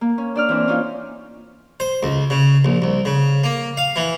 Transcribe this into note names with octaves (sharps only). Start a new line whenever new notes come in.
A#3
C#4
D4 D5 F6
E3 C4 D4
C#4 D#4 F4
C5
C#2
C#3
A#1
C2
C#3
A#3
F5
E3